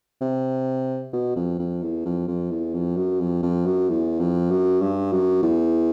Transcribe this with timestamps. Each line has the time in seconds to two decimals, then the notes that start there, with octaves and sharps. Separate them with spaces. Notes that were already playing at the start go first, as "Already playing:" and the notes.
0.21 C3
1.13 B2
1.36 F2
1.59 F2
1.83 E2
2.05 F2
2.28 F2
2.51 E2
2.74 F2
2.97 F#2
3.21 F2
3.43 F2
3.66 F#2
3.89 E2
4.20 F2
4.51 F#2
4.81 G2
5.12 F#2
5.42 E2